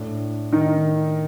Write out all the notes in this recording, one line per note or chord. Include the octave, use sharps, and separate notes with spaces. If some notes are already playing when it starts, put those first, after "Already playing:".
Already playing: A2 D4
D#3 D#4